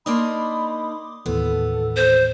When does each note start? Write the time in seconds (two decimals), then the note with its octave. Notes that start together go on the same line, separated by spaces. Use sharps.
0.06 A#3 D4 D#4 B5 C6 D6 D#6
1.26 D#2 A2 E3 B3 A4
1.96 C5